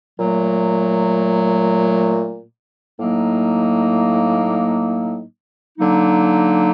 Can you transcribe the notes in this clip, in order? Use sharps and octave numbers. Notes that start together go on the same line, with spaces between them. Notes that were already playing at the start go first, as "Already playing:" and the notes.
A#2 F#3 A3
A2 F#3 A#3 D#4
D3 F#3 A#3 D#4